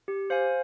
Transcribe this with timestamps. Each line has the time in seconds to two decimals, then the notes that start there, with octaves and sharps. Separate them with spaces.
0.08 G4
0.30 C5 F5 G#5